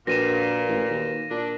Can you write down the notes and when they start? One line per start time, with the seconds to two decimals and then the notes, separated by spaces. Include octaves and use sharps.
0.07 A#1 A#2 F#4 A#4 B4 A#6 D#7 E7
0.68 A1
0.90 D#2
1.30 A#2 D4